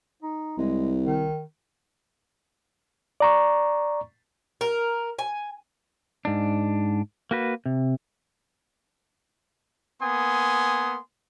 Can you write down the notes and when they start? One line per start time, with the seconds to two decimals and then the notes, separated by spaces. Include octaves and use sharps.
0.23 D#4
0.58 C2 G#3
1.06 D#3
3.20 D5 A#5 C#6
4.61 A#4
5.19 G#5
6.25 G#2 D4
7.31 A#3 F#4 B4
7.66 C3
10.01 A#3 B3 G#5 C6 D#6